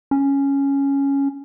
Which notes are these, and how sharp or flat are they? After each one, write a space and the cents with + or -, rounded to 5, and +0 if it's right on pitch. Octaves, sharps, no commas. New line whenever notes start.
C#4 +0